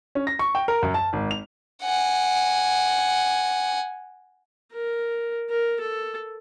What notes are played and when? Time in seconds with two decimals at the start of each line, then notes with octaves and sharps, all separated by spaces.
0.15 C#4
0.27 A#6
0.39 C#6
0.55 G5
0.68 A#4
0.83 F#2
0.94 A5
1.13 G#1
1.31 F7
1.83 F#5 G#5
4.73 A#4
5.50 A#4
5.81 A4